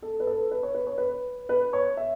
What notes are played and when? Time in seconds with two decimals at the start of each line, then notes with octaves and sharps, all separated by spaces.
0.02 A4
0.20 B4
0.27 A4
0.51 B4
0.63 C#5
0.74 B4
0.87 C#5
0.98 B4
1.49 B4
1.73 C#5
1.97 E5